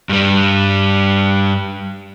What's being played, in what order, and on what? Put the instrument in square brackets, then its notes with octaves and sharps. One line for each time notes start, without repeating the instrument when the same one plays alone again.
[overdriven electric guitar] G2 G3